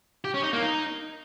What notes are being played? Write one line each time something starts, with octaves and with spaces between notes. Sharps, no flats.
G4
C#4
D#4
A#3
D#4